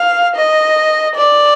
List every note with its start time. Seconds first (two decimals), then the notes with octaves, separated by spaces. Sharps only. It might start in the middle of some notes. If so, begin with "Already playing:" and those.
Already playing: F5
0.36 D#5
1.15 D5